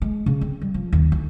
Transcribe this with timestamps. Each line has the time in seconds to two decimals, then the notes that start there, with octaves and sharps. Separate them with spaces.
0.02 G#3
0.26 C#3
0.41 C4
0.62 G3
0.74 F3
0.92 D#2
1.12 D2